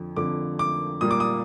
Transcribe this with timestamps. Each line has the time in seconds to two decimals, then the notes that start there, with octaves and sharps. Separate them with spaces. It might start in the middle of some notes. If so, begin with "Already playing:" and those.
Already playing: F2 D3 F3
0.16 F2 D3 F3 D6
0.59 D6
1.01 A#2 G3 A#3 D#6
1.11 D6
1.20 D#6